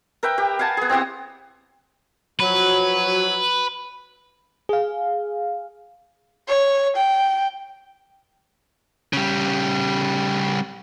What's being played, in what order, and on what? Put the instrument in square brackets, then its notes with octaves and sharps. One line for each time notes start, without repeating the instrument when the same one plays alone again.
[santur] A#4 B4 E5 G5
G4
F5 F#5 G#5 A5
B3 G#4
C4 E4 G4 F#5
[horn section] F3 F#3 [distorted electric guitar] B4
[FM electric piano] G#4 F5
[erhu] C#5
G5
[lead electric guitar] C#3 G3